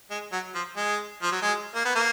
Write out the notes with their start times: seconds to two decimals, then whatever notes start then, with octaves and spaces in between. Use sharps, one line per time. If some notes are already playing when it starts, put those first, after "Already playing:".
0.11 G#3
0.32 F#3
0.55 F3
0.77 G#3
1.22 F3
1.32 F#3
1.42 G#3
1.75 A#3
1.85 B3
1.95 A#3